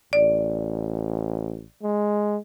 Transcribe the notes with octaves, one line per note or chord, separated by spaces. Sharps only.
A1 D5
G#3